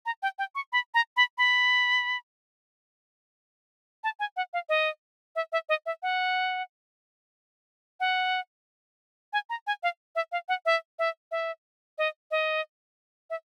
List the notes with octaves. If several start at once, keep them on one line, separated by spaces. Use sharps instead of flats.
A#5
G5
G5
C#6
B5
A#5
B5
B5
A5
G#5
F#5
F5
D#5
E5
E5
D#5
E5
F#5
F#5
G#5
A#5
G#5
F5
E5
F5
F#5
E5
E5
E5
D#5
D#5
E5